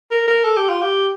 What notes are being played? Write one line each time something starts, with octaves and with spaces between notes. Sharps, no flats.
A#4
A#4
A4
G4
F4
G4